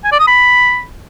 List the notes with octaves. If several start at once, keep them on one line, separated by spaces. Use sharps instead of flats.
G#5
D5
D#6
B5